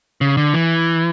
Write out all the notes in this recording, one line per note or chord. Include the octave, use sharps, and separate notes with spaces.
C#3
D3
E3